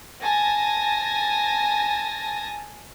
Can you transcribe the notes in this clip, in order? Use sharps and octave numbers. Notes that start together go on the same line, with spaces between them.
G#5 A5 A#6